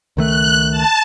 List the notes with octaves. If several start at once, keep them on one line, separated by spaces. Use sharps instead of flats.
C#2 D#3 A3 F#6
A5